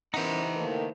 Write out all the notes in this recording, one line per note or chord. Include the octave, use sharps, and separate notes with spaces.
E3 B3 C#4 D#4 A#4 C5 E5 F#5
D#3 A3 A#3 E4 A4 B4